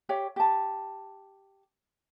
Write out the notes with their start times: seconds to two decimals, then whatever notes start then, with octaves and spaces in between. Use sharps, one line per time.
0.09 G4 C#5 E5
0.36 G4 A5